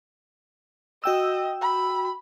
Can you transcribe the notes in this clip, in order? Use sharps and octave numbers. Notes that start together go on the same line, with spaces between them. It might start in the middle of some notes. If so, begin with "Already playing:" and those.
F#4 D#5 G5 E6
B5